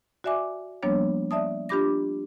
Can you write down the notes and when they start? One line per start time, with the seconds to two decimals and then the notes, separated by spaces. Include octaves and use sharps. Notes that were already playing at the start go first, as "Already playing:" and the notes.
0.24 F#4 D5 E5 G#5 D6
0.83 F3 G3 A#3 B3 D4 C#5
1.31 D5 E5 A5 D#6
1.69 D4 F4 G4 B5 D6 A#6